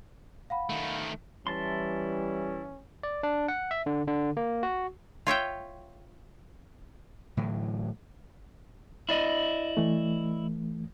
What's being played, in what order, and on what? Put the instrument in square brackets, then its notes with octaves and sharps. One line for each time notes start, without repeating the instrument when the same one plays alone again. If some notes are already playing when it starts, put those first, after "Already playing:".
[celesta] F5 F#5 B5
[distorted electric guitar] D#3 A3
[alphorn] E3 [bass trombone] G3 [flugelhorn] C#4 [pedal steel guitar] E4 A5 C6
[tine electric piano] D5
D4
F#5
E5
D3
D3
A#3
F#4
[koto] F4 C#5 E5 G5
[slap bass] A2 D3 E3 F#3
[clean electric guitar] E4 D5 D#5
[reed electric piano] E3 A3